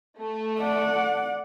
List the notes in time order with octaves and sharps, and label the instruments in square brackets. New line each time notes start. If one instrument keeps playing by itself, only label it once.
[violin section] A3
[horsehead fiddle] D5 F#5